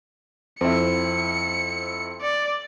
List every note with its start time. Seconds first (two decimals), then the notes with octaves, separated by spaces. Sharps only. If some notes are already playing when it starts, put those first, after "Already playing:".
0.61 F2 C4 E4 C#7
2.21 D5